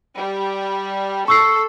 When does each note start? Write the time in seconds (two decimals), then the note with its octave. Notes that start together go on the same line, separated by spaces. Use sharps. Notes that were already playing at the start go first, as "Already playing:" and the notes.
0.16 G3
1.28 A4 C#6 E6 C7